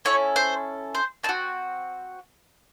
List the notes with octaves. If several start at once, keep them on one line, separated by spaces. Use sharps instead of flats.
C#4 E4 A4 C#5
C5
C5
C4 D#4 A5
F#4